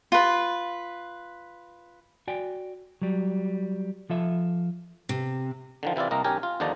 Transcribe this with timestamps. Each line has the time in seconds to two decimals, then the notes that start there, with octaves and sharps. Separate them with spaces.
0.12 F4 B4
2.28 F#4 D5 G5 G#5
3.02 F#3 G3
4.10 F3 F4 A4 E5
5.09 C3
5.83 D3 D#3 F3
5.96 C3 E3 E4 F4 D5
6.11 C2 A#3 D#5 A#5
6.24 B1 C#4 G4 A#4 G#5 A#5
6.43 F4
6.60 D#2 D3 F3 D#4 D5 A#5